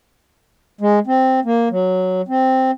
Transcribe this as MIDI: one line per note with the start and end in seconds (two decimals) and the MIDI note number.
0.81 0.99 56
1.07 1.40 60
1.45 1.69 58
1.71 2.22 54
2.28 2.71 60